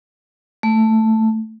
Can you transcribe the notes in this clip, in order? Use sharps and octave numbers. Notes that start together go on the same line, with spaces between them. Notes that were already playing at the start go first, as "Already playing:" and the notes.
A3